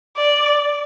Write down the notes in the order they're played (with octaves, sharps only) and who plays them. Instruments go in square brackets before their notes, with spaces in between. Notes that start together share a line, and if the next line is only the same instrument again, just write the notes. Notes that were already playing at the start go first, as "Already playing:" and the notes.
[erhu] D5